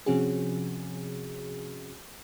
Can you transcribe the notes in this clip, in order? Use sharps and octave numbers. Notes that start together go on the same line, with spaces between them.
C3 F3 C4 C#4 F#4 G#4